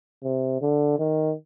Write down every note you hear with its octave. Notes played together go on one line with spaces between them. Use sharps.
C3
D3
D#3